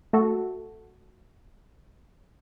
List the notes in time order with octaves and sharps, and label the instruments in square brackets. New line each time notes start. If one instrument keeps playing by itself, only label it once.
[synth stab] A3 F#4 A4